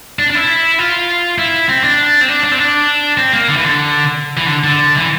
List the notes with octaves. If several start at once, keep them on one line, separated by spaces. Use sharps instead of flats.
D4
D4
E4
F4
E4
C4
D4
C4
D4
D4
C4
D4
C4
A#3
D3
E3
D3
E3
D3
D3
E3